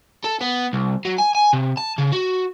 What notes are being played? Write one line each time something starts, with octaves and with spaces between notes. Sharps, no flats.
A4
B3
C2
F#3
G#5
G#5
C3
A5
C#3
F#4